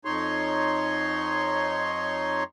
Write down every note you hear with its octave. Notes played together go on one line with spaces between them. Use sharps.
F2 D#4 C#5 C6